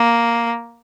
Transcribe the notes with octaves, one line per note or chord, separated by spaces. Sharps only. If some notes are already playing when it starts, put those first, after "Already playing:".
Already playing: A#3